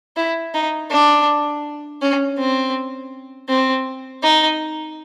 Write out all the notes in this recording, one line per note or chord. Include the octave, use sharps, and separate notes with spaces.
E4
D#4
D4
C#4
C4
C4
D#4